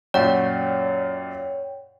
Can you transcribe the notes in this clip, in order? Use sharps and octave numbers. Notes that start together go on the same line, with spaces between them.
F#2 A#2 C#5 D5 F#5 G5